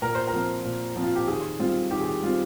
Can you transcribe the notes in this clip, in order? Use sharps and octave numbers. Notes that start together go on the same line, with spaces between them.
A#2 A#4
C5
A#4
F3 C4
A#2
F3 C4
F4
G4
D#3 G#4
G3 C4 F4
D#3 G4
G#4
G4
G3 C4 F4